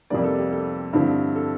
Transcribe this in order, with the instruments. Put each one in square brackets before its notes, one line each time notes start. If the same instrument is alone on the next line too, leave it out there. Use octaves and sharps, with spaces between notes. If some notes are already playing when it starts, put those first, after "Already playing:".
[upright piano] F2 C3 G3 A#3 D5
A4
G4
A4
G2 D3 F3 C4 E4
A4